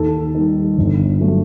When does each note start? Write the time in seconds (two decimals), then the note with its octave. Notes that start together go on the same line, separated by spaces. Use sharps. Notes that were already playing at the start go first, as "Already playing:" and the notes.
Already playing: D#2 A4
0.35 D#3 G3
0.78 G1
1.20 F#3 A3